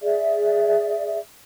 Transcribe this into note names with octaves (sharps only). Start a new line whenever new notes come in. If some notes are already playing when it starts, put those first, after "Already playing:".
G#4 D5 E5